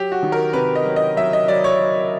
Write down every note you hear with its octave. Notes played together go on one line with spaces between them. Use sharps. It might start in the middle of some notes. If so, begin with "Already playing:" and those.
Already playing: F#3 G4
F#4
D#3
A#4
C3 B4
D#5
F#3
D#5
F#3 E5
D#5
F#3 D5
C#5
F#3